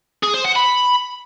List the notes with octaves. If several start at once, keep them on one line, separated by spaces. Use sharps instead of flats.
G#4
C5
F#5
B5